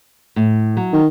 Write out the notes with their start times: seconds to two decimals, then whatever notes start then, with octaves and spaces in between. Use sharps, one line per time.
0.36 A2
0.77 F#3
0.93 D#3